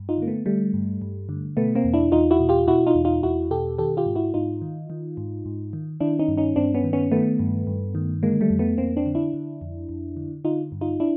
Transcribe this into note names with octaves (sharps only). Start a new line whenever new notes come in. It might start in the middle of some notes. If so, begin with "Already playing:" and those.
Already playing: G2
D#4 F4
D3 A#3
A3 B3
D3 G3 A3
G2
G2
D3
B2 A3 B3
A#3 C4
E2
D4 E4
E2 D#4 F4
E4 F#4
B2
F4 G4
B2 E4 F#4
D#4 F4
E2
D#4 F4
E2 E4 F#4
B2 G4 A4
D#3 G4 A4
F4 G4
G#2
E4 F#4
G#2 D#4 F4
D#3
D#3
G#2
G#2
D#3
D#3 D4 E4
C#4 D#4
G2
C#4 D#4
G2 C4 D4
B3 C#4
D#3
B3 C#4
D#3 A3 B3
G2
G2
D#3
D3 G#3 A#3
G3 A3
F2
A3 B3
F2 A#3 C4
C4 D4
D3
D4 E4
D3
F2
F2
D3
D3 D#4 F4
G2
D#4 F4
D4 E4